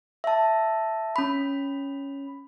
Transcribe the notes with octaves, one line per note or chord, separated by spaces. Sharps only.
E5 A5
C#4 B5